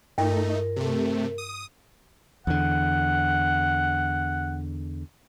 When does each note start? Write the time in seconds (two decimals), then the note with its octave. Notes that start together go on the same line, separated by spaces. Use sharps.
0.18 G2 A3 D#4 A#4
0.76 C3 A3
1.38 D#6
2.47 E2 D3 F#5